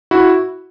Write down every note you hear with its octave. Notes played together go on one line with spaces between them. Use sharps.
E4 F#4